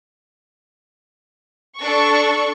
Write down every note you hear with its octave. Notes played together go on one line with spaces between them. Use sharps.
D4 A4 C#6